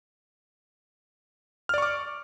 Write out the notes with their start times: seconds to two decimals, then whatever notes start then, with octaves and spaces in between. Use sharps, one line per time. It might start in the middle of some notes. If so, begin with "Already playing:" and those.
1.69 F6
1.74 D5
1.78 C#6
1.82 D6